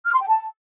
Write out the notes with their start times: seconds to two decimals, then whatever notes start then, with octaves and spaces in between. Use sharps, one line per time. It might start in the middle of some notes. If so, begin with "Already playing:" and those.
0.06 F6
0.14 C6
0.21 G5
0.28 A5